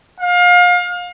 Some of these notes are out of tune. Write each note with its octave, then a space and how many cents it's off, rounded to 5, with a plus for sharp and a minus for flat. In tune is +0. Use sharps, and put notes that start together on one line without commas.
F5 +30